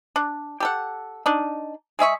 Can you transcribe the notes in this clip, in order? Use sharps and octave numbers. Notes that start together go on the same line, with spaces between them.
D4
G4 A4 F#5
D4 D#4
G#3 G#4 E5 C#6